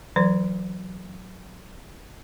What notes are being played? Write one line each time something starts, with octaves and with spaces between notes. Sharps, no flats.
E3 F#3 D5